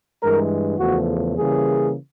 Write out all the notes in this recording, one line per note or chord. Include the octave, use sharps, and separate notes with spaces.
G2 E3 G#3 A#4
E2 C#3 F3 A3 F#4
C#3 E3 G3 A#3 G#4